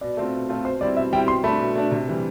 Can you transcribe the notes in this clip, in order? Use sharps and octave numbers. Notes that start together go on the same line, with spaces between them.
B2 D5
A3 C4 F4
B2
A3 C4 F4
B2 C5
G3 C4 E4 D5
B2 E5
G3 C4 E4 G5
B2 C6
A3 D4 B5
B2
A3 D4
C3
E3 G3